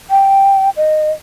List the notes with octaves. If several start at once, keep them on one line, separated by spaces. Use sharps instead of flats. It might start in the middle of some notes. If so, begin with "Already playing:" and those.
G5
D#5